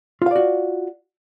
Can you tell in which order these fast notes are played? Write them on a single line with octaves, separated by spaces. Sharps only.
F4 F5 D5 F#4